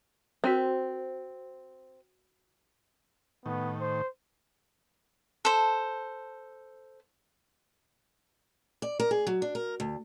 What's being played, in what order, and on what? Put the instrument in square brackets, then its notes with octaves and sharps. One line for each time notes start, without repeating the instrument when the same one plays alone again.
[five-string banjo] C4 [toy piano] F#4 A#4 C5
[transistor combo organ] A2 D#3 [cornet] B3
[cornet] C5
[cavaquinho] A4 C5
[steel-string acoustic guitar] D5
A#4
G#4
F#3
D4
A#4
D2